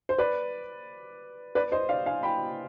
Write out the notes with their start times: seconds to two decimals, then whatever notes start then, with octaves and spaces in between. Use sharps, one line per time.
0.09 C5
0.18 B4 D5
1.55 B4 D5
1.72 C5 D#5
1.89 D5 F5
2.06 F5 G#5
2.23 G5 B5